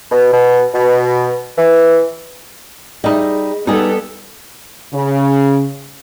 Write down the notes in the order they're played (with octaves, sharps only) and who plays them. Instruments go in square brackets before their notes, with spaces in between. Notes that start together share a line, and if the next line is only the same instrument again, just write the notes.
[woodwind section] B2
B2
B2
E3
[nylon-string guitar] G3 D#4 [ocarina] G#4 [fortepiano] D#5 E5
[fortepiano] G3 [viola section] B3 A4 [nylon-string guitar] D#4 G#4 [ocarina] B4
[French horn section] C#3